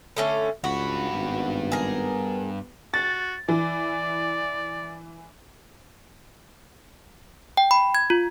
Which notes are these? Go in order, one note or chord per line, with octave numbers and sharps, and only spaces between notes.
D3 A3 C#4
C#2 G2 F#4 B5
G#1 B3
G#4 A#4
F#4 A6
E3 D5
G5
B5
G#6
F4